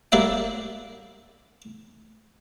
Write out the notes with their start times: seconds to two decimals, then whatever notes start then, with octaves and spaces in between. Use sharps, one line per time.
0.12 G3 A#3 D5 E5 F#5